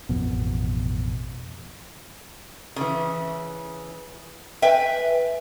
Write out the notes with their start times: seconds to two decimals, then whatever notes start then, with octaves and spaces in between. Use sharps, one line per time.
0.09 A1 F2 B2
2.76 C#3 E3
4.62 B4 E5 G5 G#5